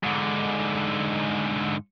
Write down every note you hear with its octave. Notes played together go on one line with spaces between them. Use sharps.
G#2 D3